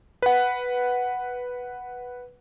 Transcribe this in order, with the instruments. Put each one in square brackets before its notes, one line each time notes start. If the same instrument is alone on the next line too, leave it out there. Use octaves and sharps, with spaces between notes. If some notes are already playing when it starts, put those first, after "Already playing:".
[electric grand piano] B4 F#5